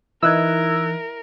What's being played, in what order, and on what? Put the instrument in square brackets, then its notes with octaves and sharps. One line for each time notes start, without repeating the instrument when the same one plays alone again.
[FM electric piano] E3 D#4 [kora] E4 D#5 [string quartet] A#4 [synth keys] E6 F#6 G#6